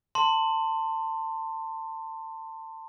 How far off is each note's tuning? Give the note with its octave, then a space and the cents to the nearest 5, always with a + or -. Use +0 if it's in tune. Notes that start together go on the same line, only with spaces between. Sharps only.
A5 +25 C6 +0